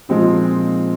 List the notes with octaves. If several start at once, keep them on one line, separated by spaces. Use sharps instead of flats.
A#2 F3 G#3 C4 D#4